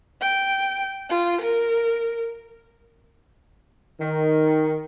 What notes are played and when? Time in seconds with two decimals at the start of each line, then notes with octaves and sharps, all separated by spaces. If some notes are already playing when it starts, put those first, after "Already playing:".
0.21 G5
1.09 F4
1.41 A#4
4.00 D#3